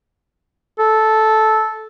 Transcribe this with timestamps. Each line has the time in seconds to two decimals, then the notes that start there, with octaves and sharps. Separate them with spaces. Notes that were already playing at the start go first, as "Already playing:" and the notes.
0.79 A4